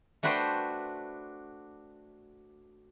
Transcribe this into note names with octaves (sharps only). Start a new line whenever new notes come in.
A3 D4 F#4 B4 C5 G5